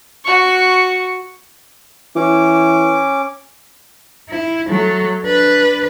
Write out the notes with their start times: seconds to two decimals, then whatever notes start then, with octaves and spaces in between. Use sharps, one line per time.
0.24 F#4 C#6
2.16 E3 C#4 D6
4.29 E4
4.68 F#3 A3
5.24 D4 B4